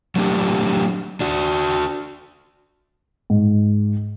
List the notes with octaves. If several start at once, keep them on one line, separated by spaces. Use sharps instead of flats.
F#3 A3 D4 G4
D4 F#4
G#2